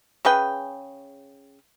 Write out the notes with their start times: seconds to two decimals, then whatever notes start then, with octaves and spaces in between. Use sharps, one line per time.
0.25 C#3 G#4 B4 G5